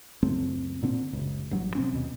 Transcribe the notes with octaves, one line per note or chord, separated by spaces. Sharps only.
C#2 F#2 A3 C4
A#2 D3 C4
F#1 C#2
A1 G2 F#3
C3 C4 C#4
D#2 B2